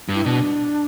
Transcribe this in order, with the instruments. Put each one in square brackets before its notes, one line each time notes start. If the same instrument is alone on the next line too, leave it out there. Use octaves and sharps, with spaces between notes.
[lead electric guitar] G2
[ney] E4
[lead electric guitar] B2 [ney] D4